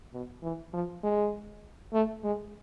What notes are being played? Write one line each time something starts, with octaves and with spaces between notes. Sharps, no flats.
B2
E3
F3
G#3
A3
G#3